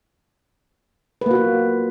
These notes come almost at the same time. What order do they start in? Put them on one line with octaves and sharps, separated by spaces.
B4 A#3 F#4 F4